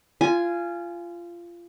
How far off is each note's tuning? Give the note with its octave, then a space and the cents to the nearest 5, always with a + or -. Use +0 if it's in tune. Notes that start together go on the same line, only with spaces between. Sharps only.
F4 -20 G#5 +0